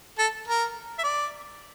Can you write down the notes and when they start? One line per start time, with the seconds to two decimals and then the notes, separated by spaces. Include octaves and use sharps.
0.18 A4
0.48 A#4
0.99 E5
1.03 D5